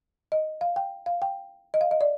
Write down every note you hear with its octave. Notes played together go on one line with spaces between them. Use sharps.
D#5
F5
G5
F5
G5
D#5
F5
D#5
D5